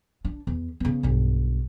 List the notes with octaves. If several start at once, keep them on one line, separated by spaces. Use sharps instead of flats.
D4
E2
C#3 B3
B1 G2